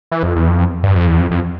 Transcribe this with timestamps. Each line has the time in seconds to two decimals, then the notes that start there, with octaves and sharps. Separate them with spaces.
0.11 E3
0.23 F2
0.36 E2
0.48 F2
0.83 G2
0.95 F2
1.07 E2
1.20 F2
1.31 F2